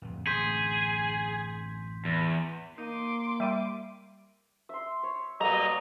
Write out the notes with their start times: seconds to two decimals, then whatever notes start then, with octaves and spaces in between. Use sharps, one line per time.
0.02 D1 F2
0.26 A1 F#2 D3 G#4 C6 G6 B6
2.05 E2
2.78 A#3 D#4 C6 D6 D#7
3.40 G3 E5 D#7
4.69 E5 C6
5.03 C#5
5.41 F#3 G3 A#3 B3 A4 D5 D#5 A#5